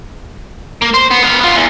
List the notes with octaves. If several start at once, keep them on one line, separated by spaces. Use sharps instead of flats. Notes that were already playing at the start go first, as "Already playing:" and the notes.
A#3
C5
B3
B3 F5
B3 F4
E2